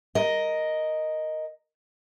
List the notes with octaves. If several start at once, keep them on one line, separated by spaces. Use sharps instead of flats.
A#4 D#5